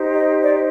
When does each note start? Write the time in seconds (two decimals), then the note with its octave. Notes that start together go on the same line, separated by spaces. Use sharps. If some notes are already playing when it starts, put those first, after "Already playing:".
Already playing: D#4 G4 C5
0.15 D#5
0.43 D5